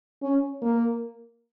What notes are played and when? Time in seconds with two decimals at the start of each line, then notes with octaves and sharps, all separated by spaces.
0.23 C#4
0.62 A#3